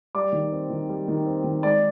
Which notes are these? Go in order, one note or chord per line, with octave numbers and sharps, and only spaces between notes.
G3 D5 D6
D#3
C4
D#3
G3
D#3
C4
D#3
G#3 D5 D6